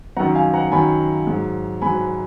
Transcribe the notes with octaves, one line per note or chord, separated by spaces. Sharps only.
F#2 D#3 F#3 F#5 A#5
F5 G#5
F#5 A#5
F#2 D#3 F#3 G#5 B5
G#2 F#3
G#2 F#3 G#5 B5